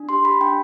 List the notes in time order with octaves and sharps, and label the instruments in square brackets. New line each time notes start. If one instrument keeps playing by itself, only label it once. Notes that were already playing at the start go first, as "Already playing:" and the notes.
Already playing: [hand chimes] D4
G4 C6
G4 B5
D4 G5